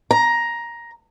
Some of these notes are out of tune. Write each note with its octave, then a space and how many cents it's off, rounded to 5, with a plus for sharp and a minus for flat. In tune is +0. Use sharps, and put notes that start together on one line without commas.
A#5 +10